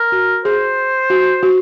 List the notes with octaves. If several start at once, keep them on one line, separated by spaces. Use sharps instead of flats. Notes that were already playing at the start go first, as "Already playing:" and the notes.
Already playing: A#4
F#4
G#4 C5
F#4
F#4